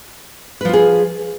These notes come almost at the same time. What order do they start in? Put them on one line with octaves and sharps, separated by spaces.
B4 F3 F4 G#4